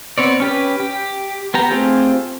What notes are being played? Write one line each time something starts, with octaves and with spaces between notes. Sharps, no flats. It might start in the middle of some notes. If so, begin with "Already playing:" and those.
B3 C4 C#5 D5
C#4 G4 B4
G4
B3 G4 A#5
A3 C4 F4 G4 G#4